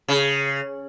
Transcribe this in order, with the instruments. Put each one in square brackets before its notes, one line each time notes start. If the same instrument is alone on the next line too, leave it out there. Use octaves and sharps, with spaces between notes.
[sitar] C#3